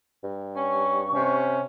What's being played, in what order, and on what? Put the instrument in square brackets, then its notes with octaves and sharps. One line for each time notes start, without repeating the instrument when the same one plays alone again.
[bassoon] G2
[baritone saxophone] C#4 [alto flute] C#6
[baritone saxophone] C3 [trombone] C#4